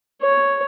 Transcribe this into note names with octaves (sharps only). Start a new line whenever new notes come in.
C#5